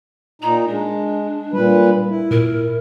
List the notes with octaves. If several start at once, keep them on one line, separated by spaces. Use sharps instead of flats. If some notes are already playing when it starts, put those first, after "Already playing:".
A#2 D#4 A#5
G#3 D4
A#2 G3 B4
E4
A#2 A#4